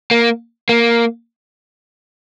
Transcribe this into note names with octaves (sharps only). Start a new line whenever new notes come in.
A#3
A#3